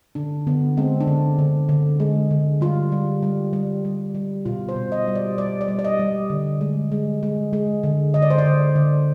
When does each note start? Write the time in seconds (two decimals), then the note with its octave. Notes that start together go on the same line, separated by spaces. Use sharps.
0.15 D3 D4
0.47 D3 B3
0.77 G#3 C4
1.01 D4
1.07 D3
1.39 D3
1.69 D3
2.00 G#3
2.31 D3
2.61 G3 F4
2.92 G3
3.23 G3
3.53 G3
3.85 G3
4.15 G3
4.45 B2 F4
4.69 C5
4.76 B2
4.92 D#5
5.07 G3
5.15 D5
5.38 G3 D5
5.61 D5
5.68 G3
5.79 D5
5.85 D#5
6.00 G3
6.30 D3
6.61 G#3
6.92 G#3
7.23 G#3
7.53 G#3
7.83 D3
8.14 D3 D#5
8.22 D5
8.30 C5
8.38 D5
8.46 D3
8.76 D3